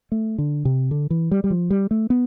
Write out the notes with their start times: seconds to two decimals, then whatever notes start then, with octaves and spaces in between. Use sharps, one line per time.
0.12 A3
0.38 D3
0.65 C3
0.91 D3
1.10 E3
1.31 G3
1.44 G3
1.51 F3
1.70 G3
1.91 A3
2.10 B3